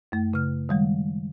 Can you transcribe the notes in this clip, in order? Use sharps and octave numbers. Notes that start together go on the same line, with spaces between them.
F#2 A3
C#3 F6
D#3 G3 G#3